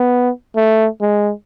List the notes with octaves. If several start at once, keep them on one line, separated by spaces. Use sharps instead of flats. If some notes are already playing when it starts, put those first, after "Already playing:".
Already playing: B3
A3
G#3